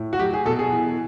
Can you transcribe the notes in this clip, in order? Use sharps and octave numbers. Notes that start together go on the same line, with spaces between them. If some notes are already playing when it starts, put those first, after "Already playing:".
Already playing: A2
F#4
F#3 G4
G#4
B2 A4
G#4
E3